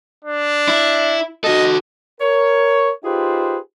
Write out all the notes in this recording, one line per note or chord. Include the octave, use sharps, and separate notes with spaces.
D4
E4
F#4 A4 D#5
A#4 C#5
D#4 F4 G4 G#4 B4 C5